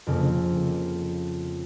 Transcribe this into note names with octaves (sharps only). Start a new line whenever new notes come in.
F2 C#3 A#3